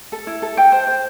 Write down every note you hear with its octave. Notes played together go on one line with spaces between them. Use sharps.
A4
E4
A4
G5
C5
C5